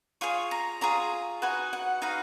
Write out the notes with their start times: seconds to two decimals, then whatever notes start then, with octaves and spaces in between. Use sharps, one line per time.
0.21 F4 G#4 C#5 C#6
0.51 A#5
0.81 F4 G#4 C#5 A#5
1.42 D#4 F#4 B4 G#5
1.73 F#5
2.02 D#4 F#4 B4 F5